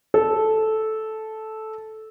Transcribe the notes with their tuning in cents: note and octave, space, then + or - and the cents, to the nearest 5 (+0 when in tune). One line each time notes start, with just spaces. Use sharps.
A4 -10